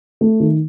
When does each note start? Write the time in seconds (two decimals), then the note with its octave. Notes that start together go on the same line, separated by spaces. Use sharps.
0.21 A3
0.40 D#3